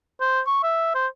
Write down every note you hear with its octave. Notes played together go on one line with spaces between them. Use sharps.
C5
C#6
E5
C5